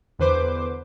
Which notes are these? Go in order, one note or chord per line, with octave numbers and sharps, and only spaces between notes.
E2 D3 B4 C5 D6